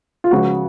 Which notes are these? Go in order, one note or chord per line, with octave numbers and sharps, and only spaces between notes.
F4
C#2 C#3 F3 F#4